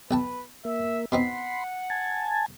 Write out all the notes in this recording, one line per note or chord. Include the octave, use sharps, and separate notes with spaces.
B1 B4 G5 A5
A#3 E5
B2 C4 D#4 F#5 B5 C6
G#5 A5